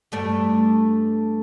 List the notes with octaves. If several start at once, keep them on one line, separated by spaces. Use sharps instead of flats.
G2 A3 D5